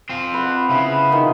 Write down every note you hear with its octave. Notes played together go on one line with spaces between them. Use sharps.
C4 F4
B4 F#5
C#3 B3 E4
D#3 F3